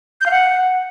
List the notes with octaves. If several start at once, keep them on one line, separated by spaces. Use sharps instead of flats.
G6
F5
F#5